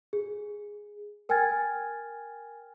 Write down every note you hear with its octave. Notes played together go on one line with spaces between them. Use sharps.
G#4
A#4 G5 G#5 F6 G#6 A6